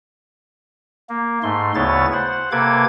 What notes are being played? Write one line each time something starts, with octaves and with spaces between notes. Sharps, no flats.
A#3
G#2 A3 C6
D2 C#3 B3 E4 C#5 A6
C5 F#5
C3 A#3 A4 B4 D6 G#6